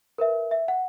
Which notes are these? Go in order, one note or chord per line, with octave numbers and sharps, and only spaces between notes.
A#4 B4 E5
E5
F#5